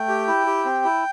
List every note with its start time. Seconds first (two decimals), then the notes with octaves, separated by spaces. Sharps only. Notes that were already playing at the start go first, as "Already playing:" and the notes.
Already playing: A3 G5
0.08 G4
0.27 E4
0.47 G4
0.65 C4
0.85 E4